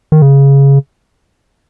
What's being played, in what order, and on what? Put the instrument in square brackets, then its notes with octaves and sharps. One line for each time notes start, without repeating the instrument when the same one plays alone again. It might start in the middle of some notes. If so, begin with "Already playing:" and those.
[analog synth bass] D#3
C#3